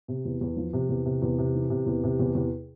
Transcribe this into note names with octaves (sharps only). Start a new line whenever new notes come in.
C3
E2
E2
F3
C3
E2
C3
E2
C3
E3
C3
E2
C3
E2
E2